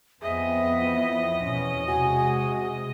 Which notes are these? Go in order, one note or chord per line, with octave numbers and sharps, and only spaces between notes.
F2 B3 C4 G#4 D#5 E5
E3
E2 B2 C#4
C3 G#3 F#4 G#5